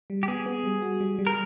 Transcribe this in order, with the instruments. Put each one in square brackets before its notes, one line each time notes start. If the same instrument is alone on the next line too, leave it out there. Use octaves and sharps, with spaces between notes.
[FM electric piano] G3
[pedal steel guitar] G4
[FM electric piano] B3 [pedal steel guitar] G#4
[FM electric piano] B3
G3
F#4
G3
G3
[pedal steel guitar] A#4